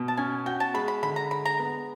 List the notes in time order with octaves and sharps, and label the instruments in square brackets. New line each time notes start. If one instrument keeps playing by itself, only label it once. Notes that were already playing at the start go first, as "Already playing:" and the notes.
Already playing: [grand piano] B2
[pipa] A5
[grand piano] C#4 [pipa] G#5
[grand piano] F#4 [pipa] G5
[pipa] A5
[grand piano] G#3 [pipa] B5
[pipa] B5
[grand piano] D3 [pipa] B5
[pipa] A#5
[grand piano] G#3 [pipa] B5
[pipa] A#5
[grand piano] B3